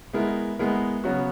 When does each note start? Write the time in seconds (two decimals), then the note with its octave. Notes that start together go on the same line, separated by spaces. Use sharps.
0.13 G#3 B3 E4 A#4
0.59 G#3 B3 E4 A#4
1.04 C#3 F#3 B3 F#4